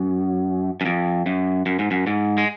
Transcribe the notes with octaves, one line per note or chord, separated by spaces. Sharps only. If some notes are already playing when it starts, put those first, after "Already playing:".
Already playing: F#2
F#2
F2
F#2
F#2
G#2
F#2
G#2
G#3